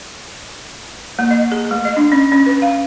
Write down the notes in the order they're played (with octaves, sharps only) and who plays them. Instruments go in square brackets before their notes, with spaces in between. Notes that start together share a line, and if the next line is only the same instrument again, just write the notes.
[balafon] A#3
D#5
G#4
A3
D#5
D4
C#4
C#4
B4
F5